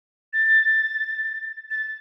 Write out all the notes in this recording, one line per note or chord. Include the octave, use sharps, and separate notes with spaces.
A6
A6